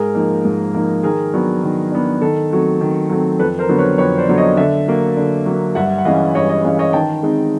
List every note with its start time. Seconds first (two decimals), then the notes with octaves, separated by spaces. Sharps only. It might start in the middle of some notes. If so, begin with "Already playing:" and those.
Already playing: G#2 G#4 A#4
0.15 F3 A#3 D#4
0.45 G#2
0.75 F3 A#3 D#4
1.03 D#3 G#4 A#4
1.33 F#3 B3 D4
1.63 D#3
1.92 F#3 B3 D4
2.21 D#3 A4
2.51 F#3 A3 C4
2.81 D#3
3.10 F#3 A3 C4
3.39 F2 A4 B4
3.59 A#4 C5
3.69 D3 F#3 B3
3.78 B4 C#5
3.98 F2 B4 C#5
4.18 C5 D5
4.28 D3 F#3 B3
4.38 C#5 D#5
4.57 D3 D5 E5
4.88 F#3 A#3
5.17 D3
5.46 F#3 A#3
5.75 G2 E5 F#5
5.98 F#5
6.05 E3 G#3 C#4 D#5 F5
6.35 G2 C#5 D#5
6.49 C#5 D#5
6.64 E3 G#3 C#4 D#5 F5
6.79 C#5 D#5
6.93 D#3 G5 A5
7.23 G#3 C4 D#4